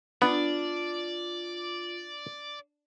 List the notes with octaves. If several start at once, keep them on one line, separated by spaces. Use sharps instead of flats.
B3 D4 F4 D5